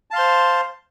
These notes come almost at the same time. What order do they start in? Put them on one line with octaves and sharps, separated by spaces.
A5 F5 C6 C5